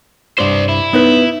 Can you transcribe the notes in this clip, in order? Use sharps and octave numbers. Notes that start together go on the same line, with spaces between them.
C2 G2 C5 D5 C6
E4
B3 D#4 B4